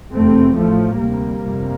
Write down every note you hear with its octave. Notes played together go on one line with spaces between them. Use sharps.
F1 E2 C3 A3 C4
A1 A2 F3 A3
D2 C3 G3 A#3
G1 F2 C3